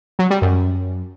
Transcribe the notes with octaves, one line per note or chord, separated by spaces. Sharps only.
F#3
G3
F#2